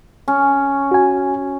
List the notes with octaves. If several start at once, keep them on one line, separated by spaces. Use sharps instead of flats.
C#4
F#4 G#5